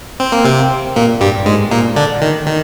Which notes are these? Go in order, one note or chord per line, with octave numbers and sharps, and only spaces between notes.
C4
A#3
C3 C4
A#2 A#3
G2 G3
G#2 G#3
A#2 A#3
D3 D4
D#3
D#3